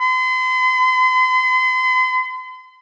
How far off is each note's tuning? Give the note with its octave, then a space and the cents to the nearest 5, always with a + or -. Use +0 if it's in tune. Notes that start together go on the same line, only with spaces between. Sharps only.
C6 -40